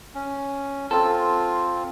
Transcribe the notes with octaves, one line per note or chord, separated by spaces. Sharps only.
C#4
C4 F4 A4